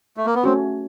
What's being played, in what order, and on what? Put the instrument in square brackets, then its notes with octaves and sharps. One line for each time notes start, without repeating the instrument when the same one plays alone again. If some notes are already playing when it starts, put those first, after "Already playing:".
[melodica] A3
A#3
B3
[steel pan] A3 C#4 F#4 [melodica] C4